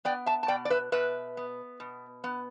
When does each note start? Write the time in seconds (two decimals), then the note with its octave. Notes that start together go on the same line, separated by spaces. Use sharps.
0.05 B3 D5 G5
0.26 E5 A5
0.43 A5
0.48 B2 D5 G5
0.65 D5
0.70 B4 E5
0.92 B2 B4 E5
1.37 B3
1.80 B2
2.24 B3